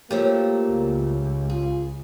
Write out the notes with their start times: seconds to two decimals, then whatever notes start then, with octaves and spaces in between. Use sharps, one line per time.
0.11 F3 F#3 A3 A#3 G4
0.70 C#2
1.50 F4 G#4